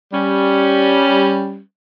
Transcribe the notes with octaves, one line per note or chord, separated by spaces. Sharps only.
G3 C#4